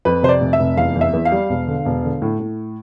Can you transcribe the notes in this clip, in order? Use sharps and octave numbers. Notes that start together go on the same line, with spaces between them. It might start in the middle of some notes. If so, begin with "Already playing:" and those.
F2 B4
C3 C5
D5
F1
E5
F1
E2 F5
E2
E5
E2
F5
G3
E1
D3
E1
D3
A2
A2